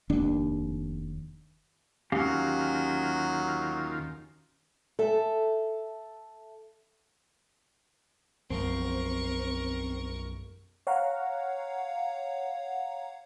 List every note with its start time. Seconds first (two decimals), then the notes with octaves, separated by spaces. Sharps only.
0.09 F1 D#2 D4
2.12 D#2 D#3 F#3 C#4 F4 G4 F5
4.99 A4 E5
8.50 B1 F#2 F3 C4 A#4 C#6
10.87 C#5 F5 F#5 A#5